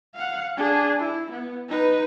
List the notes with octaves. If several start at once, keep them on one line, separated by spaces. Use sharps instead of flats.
F5 F#5
D4 G#4
E4
B3
D#4 B4